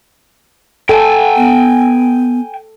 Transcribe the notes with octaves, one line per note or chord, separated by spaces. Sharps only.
A4 G5 G#5
B3